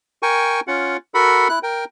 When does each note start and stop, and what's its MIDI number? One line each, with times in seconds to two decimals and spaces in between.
0.23 0.60 70
0.23 0.60 79
0.23 0.60 80
0.23 0.60 85
0.68 0.97 61
0.68 0.97 65
0.68 0.97 78
1.14 1.48 66
1.14 1.48 69
1.14 1.48 70
1.14 1.48 78
1.14 1.48 83
1.49 1.59 64
1.49 1.59 90
1.63 1.85 70
1.63 1.85 79